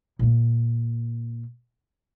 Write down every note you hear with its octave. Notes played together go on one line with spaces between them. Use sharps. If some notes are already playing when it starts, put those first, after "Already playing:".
A#2 A#3